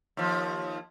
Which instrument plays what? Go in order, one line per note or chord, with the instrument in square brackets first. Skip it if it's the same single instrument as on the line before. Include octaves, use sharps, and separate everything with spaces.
[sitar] D#2 F3